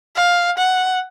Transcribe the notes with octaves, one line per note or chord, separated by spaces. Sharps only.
F5
F#5